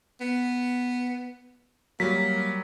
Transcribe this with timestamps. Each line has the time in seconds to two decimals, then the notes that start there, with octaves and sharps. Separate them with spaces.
0.21 B3
2.00 F#3 G3 A#3 B6